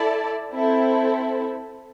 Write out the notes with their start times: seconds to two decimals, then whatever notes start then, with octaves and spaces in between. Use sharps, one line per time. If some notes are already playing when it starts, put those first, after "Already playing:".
Already playing: E4 A4 D5 A5
0.52 C4 E4 A4